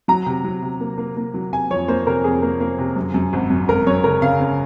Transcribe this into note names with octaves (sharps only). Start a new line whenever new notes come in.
F#3 A#5
C3
F#3
C3
A#3
A#3
A#3
F#3
C3 G#5
F2 C#5
A#3 C5
C3 A#4
F2 G#4
A#3
A#3
C3
F#2
F#2
G#1
F#2
G#1 A#4
F#2 C#5
C#3 A#4
C#3 F5
C#3